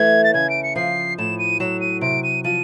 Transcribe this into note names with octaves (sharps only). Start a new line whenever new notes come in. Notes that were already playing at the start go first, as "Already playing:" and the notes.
Already playing: E3 A3 G#6
A6
C#3 G#6
D7
C#7
F3 C7
A2 E7
D#7
F#3 E7
D#7
C3 D7
D#7
F3 D#7